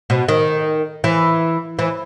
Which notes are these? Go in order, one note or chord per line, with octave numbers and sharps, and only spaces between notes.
B2
D#3
E3
E3